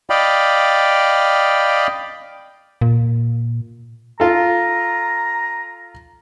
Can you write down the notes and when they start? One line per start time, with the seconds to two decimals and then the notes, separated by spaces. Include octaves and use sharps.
0.10 D5 D#5 F5 G5 B5
2.81 A#2
4.20 F4 A4 A#5